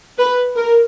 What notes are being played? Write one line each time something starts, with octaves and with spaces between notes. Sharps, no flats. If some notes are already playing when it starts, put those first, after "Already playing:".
B4
A#4